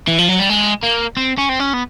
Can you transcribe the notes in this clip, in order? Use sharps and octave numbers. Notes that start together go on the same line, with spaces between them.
E3
F3
F#3
G3
G#3
A#3
C4
C#4
C4
C#4
B3